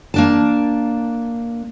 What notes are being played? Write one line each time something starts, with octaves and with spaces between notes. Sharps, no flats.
A#3 D4 A5